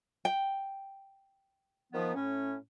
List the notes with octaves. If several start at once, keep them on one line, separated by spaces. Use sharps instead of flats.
G5
D#3 F3 B3
A2 C#4